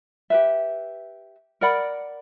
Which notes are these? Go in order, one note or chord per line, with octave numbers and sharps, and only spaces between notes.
G4 B4 E5
A#4 D5 F#5 B5